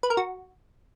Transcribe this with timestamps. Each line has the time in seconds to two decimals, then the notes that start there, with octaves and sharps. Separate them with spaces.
0.03 B4
0.10 A#4
0.17 F#4